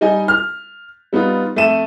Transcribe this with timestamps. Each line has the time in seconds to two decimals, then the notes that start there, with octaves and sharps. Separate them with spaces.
0.01 G3 D#4 D#5 G#5
0.28 F6
1.13 G3 B3 D#4 F4
1.56 F2 A3 A4 E5 D#7 E7